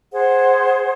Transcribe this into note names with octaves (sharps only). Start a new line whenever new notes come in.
G#4 C5 F#5